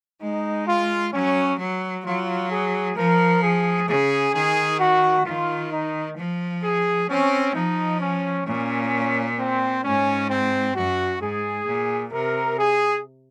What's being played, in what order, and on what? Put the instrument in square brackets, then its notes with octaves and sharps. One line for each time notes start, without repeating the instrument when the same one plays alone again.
[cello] G#3 [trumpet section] D#4
[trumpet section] F4
[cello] F#3 [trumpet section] C#4
[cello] F#3
[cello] F#3 [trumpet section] F4
[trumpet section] G#4
[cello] F3 [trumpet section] A#4
[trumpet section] G#4
[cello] C#3 [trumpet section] G#4
[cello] D#3 [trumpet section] G#4
[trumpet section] F#4
[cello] D#3 [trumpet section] F4
[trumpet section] D#4
[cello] F3
[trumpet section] G#4
[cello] C4 [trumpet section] C#4
[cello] F3 [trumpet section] D#4
[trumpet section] C#4
[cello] A#2 [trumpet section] C#4
[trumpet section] C4
[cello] G#2 [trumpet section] C#4
[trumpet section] C4
[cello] F#2 [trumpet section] F#4
[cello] G#2 [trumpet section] G#4
[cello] A#2
[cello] C3 [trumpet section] A#4
[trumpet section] G#4